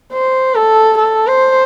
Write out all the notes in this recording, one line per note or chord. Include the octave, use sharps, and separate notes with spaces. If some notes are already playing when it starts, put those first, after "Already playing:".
C5
A4
A4
C5